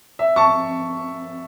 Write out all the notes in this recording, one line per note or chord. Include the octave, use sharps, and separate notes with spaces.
E5
A5 C#6